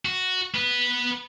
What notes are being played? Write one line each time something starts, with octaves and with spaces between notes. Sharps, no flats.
F#4
B3 B4